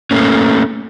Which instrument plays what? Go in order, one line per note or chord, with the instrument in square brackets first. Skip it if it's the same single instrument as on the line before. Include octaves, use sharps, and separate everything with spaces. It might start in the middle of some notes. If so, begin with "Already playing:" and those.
[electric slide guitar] A3 A#3 C#4